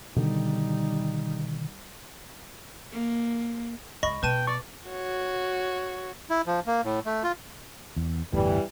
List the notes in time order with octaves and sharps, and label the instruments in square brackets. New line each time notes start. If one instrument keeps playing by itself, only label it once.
[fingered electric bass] B2 D3 D#3 [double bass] G3 D#4
[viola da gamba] A#3
[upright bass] C#2 [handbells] D#5 [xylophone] B5 C#6 A#6
[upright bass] B2 [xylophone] B4 A5 D#7 [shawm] G5
[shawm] D5 [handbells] C#6
[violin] F#4 C#5
[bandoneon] E4
F3
A#3
A2
A3
F4
[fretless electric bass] E2
[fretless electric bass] G1 E2 A2 [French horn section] E3 G3